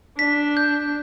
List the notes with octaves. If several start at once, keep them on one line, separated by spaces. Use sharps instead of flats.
D4 B6
G6